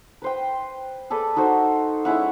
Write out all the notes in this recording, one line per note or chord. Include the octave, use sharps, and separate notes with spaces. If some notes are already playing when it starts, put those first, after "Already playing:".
B4 C5 G5
G#4 A4 B4 D5
D#4 F#4 A4 C5
G#3 C#4 E4 F#5